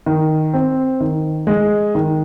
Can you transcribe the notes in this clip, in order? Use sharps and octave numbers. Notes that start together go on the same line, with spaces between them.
D#3
C4
D#3
G#3
D#3